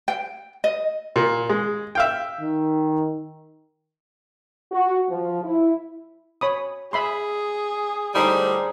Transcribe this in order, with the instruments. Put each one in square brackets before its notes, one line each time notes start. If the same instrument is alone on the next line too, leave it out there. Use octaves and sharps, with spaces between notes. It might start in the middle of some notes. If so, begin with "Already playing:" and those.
[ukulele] G5
D#5
[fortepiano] A#2
G#3
E5 F5 G5
[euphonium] D#3
[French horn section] F#4
F3
E4
[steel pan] C#5 B5 D#6
[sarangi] G#4 [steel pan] E5 B5 C6
[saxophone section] A2 D3 G3 [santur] G#3 D#4 C5 [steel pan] B5 D#6